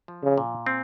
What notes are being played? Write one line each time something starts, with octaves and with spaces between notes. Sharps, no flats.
F3
C#3
A#2
C4